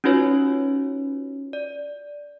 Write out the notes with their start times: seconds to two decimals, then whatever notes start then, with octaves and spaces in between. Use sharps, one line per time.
0.04 C#4 D#4 F4 F#4 B4 C#5
1.53 D5